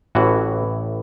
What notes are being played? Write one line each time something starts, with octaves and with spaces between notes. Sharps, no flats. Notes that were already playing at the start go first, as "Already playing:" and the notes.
A1 A2 E3 F#4